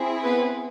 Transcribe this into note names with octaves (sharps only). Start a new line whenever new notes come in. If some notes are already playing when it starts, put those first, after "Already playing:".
Already playing: C4 E4 G#4
B3 B4